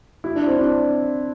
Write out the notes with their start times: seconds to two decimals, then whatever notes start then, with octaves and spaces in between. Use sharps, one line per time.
0.24 E4
0.36 D4
0.47 C4
0.58 D4